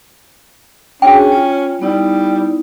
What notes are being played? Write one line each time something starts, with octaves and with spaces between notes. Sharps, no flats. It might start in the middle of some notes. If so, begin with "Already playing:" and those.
C#4 D4 F#4 G#4 G5
F4 C#5
G3 B3 D#4 E4